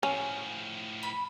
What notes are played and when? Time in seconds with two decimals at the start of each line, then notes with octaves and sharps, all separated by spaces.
0.03 A2 F3 C#4
1.03 B5